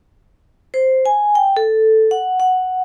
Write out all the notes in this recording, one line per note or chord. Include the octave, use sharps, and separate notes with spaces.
C5
G#5
G5
A4
F#5
F#5